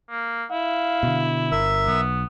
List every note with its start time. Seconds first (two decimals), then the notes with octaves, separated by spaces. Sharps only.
0.10 A#3
0.51 E4 F5
1.03 B2 D3
1.52 G1 A#4 E5 E6
1.87 B1 B3